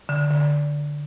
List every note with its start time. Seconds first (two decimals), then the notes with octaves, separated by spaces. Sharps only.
0.09 D3
0.30 D3